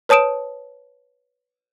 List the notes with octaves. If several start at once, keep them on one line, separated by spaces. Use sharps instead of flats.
B4 C#5 A5 D#6 D7 E7